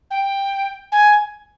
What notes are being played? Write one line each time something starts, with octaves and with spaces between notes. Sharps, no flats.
G5
G#5